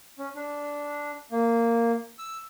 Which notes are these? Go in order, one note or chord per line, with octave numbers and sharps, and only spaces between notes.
C#4
D4
A#3
E6